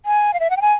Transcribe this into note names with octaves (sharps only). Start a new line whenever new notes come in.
G#5
F5
E5
F#5
G5
G#5